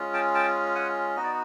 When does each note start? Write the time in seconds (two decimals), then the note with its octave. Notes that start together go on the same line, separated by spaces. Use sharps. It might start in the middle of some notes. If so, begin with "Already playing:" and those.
Already playing: G#3 C#4 F4
0.14 G5 A5
0.35 G5 A5
0.75 F#5 G#5
1.16 B3 D#4 F#4 D#5
1.24 D5